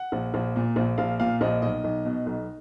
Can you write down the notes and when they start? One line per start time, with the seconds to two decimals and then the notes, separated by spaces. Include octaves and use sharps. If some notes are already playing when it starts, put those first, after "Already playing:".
Already playing: F#5
0.12 A#1
0.34 A#1
0.56 A#2
0.76 A#1
0.98 A#1 F5
1.19 A#2 F5
1.41 A#1 D#5
1.62 B1 D#5
1.84 B1
2.05 B2
2.26 B1